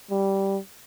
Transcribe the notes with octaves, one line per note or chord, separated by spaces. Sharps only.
G3